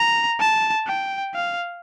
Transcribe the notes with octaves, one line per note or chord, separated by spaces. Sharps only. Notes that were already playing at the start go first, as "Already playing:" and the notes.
Already playing: A#5
A5
G5
F5